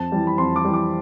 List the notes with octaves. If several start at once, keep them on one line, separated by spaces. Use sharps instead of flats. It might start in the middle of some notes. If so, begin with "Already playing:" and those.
Already playing: F2 A5
E3 G3
B5
F2 C6
D6
E3 G3
D6